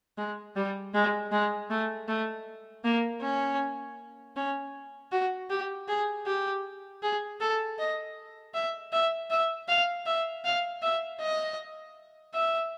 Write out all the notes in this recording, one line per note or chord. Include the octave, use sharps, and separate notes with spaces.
G#3
G3
G#3
G#3
A3
A3
A#3
C#4
C#4
F#4
G4
G#4
G4
G#4
A4
D#5
E5
E5
E5
F5
E5
F5
E5
D#5
E5